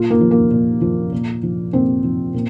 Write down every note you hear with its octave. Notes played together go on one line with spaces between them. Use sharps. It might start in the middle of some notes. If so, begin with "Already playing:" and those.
Already playing: A#2 F4
A#3
F3
A#3
A#2
F3
A#2
F3
A#2 C4
F3
A#2